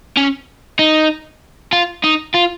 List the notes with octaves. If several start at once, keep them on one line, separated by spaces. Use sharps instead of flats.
C#4
D#4
F4
D#4
F4